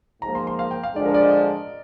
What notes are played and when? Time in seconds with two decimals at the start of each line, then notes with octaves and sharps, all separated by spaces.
0.22 G#2 F3 A#3 A#5
0.35 C6
0.47 C6
0.59 F5
0.71 G5
0.83 F5
0.95 D3 F3 G#3 D4 D5
1.05 A#4
1.14 D5
1.23 D#5